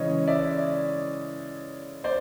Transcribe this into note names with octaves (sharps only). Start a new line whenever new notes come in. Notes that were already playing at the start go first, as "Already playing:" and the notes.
Already playing: C#3 E3 G#3 C#5 D#5
D5 E5
C5 D5